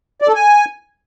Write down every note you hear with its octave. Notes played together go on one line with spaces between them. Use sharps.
D5
A4
G#5